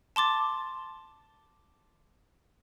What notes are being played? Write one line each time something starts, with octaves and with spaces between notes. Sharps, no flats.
A5 C6 D6 A6